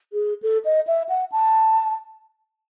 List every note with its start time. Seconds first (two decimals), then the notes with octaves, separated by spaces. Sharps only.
0.13 G#4
0.42 A4
0.65 D#5
0.87 E5
1.09 F#5
1.32 A5